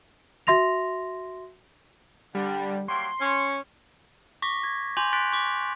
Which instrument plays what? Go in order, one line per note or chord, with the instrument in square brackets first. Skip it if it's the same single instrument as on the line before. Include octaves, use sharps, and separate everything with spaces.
[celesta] F#4 E5 C6 A#6 F7
[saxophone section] D3 [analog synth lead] G3
[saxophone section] F#3 G3 A#3 [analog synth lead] C6
[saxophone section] C#4
[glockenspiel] C#6 D6 A#6 B6
G#6
G#5 C6 D6 G6 F7 F#7
C6 F#6 A6 B6 D7
C#6 D6 B6